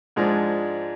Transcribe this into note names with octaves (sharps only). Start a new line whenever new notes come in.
G#2 F3 G#3 D4